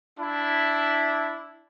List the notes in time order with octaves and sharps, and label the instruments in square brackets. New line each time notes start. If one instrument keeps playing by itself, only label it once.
[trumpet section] D4 E4